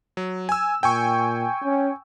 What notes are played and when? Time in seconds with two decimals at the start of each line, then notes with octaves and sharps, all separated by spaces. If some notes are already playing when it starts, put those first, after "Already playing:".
0.17 F#3
0.49 G#5 E6
0.83 A#2 G5 G#5 C#6
1.64 C#4